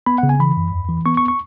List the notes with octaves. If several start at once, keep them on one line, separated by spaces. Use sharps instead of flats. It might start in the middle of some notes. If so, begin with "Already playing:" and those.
B3 B5
C#3 F#5
G#5
E3 B5
F#2
E2
E3
B3 C#6
C#6
C#6